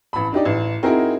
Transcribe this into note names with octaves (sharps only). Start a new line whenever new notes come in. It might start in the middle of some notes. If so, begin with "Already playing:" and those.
A1 B5
D4 D#4 G4 D5
A1
C4 D#4 E4 F#4 G#4 A#4